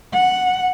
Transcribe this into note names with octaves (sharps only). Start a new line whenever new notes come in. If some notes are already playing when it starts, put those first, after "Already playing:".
F#5